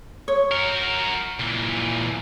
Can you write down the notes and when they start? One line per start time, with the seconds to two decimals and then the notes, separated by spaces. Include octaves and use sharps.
0.28 C#5
0.51 F#4 A#4
1.39 A#2 E3